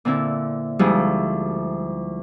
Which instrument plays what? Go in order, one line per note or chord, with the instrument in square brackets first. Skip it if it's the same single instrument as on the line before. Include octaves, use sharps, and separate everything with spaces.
[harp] A#2 D3 C4 E4
D2 F3 G3 G#3 D#4 E4